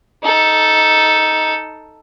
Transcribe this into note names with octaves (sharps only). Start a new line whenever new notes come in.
D#4 A4